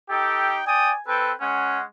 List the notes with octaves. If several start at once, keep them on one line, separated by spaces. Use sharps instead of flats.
D#4 G4 A4 G5
D5 G5 G#5 D#6
C4 A4 B4 G5
G#3 C#4 F#5